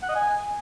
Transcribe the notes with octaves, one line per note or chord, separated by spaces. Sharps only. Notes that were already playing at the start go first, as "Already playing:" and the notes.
F#5
D#5
G#5